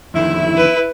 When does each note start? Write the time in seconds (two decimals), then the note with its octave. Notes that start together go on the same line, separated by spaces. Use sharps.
0.14 F2 D3 D#3 E4
0.57 B4